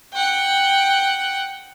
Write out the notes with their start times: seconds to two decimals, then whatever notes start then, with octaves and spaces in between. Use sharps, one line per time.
0.14 F#5 G5